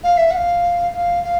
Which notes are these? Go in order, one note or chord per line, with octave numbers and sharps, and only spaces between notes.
F5
E5
F#5
F5
F5
F5